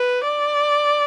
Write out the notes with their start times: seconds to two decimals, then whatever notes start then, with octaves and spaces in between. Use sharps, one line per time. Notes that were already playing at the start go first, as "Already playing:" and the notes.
Already playing: B4
0.24 D5